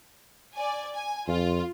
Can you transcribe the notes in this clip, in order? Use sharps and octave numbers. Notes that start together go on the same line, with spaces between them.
D5 G#5
G#5
F2 F4